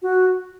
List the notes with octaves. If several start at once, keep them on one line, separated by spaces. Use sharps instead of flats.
F#4